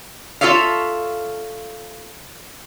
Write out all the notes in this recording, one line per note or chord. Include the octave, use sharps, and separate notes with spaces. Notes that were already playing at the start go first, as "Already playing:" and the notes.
F4 A4 C#5 E5 F5